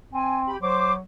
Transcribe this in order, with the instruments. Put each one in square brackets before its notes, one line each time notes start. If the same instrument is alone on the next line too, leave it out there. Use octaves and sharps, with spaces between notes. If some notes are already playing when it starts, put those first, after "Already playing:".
[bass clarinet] C4 [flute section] G#5
[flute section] G4 B5
[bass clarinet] F#3 [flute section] C5 D6